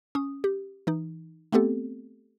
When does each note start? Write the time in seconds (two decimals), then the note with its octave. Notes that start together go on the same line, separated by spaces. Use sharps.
0.15 C#4 D#6
0.44 G4
0.87 E3 D#4
1.52 A3 B3 C4 G4 A4